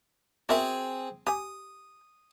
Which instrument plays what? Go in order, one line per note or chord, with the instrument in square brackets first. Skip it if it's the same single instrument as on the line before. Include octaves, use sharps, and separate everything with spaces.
[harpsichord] C4 G#4 [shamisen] F#4 A#4 E5
[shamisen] G4 G#5 [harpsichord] D#6